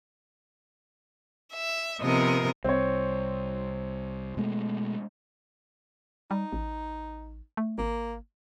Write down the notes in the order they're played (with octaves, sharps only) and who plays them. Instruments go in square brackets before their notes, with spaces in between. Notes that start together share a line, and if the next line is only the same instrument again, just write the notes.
[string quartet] E5
[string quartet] C3 A#4 [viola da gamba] F3 B3 D#5
[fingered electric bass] C2 [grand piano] C4 C#5
[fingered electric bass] B2 G#3 A3
[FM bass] G3 [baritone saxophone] D#4
[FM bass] A1
A3
[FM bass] G#1 [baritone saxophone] A#3